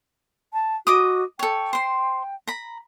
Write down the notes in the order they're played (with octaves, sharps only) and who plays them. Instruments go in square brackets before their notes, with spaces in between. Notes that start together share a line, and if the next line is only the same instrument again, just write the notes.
[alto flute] A5
[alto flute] F#4 [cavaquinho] D#5 D6 D#6
[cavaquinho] A4 C#5 [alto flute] G5
[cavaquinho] C5 C6
A#5 B5